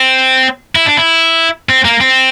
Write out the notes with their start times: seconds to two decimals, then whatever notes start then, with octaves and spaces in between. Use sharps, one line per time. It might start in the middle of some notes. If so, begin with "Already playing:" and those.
Already playing: C4
0.75 E4
0.86 D4
0.97 E4
1.69 C4
1.85 A#3
2.01 C4